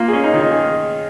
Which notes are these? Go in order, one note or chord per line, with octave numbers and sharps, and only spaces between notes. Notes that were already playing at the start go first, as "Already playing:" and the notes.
Already playing: A#3 F4
C#4 G#4
D#4
D#3 F4
D#4
G#4